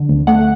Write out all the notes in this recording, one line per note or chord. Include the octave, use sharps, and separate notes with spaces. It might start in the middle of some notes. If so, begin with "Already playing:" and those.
Already playing: D3
D2
A3 F#5